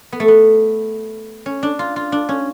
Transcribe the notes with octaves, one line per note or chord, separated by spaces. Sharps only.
B3
A3
B3
C#4
D4
F4
F4
D4
C#4